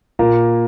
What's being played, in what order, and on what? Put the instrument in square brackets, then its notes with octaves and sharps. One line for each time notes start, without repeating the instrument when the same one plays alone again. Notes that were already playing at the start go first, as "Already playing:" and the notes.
[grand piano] A#2 A#3